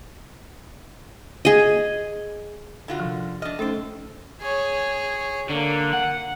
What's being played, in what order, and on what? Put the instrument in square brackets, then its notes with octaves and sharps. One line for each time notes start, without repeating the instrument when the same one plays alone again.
[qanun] G#4 D#5
[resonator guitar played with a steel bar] D3 F4 F#4
[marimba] C3 F3
[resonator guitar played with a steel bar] D4 D#5 [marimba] F6
[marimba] A3 C#4 D#4 [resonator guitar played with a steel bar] A4 C5
[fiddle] G#4 C#5
[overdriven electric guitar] D3 [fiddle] A#3
[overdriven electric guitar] F#5